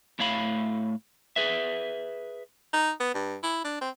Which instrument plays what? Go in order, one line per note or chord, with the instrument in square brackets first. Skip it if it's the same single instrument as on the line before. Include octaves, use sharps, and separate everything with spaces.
[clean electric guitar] A2 A3 C#5 F5 B5
G#4 B4 E5
[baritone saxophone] D#4
B3
G2
E4
D4
C4